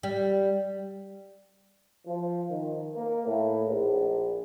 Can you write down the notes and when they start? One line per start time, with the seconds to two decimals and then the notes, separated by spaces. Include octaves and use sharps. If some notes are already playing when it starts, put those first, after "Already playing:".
0.03 G3
2.08 F3
2.50 D#3
2.96 A#3
3.27 A2
3.68 A#1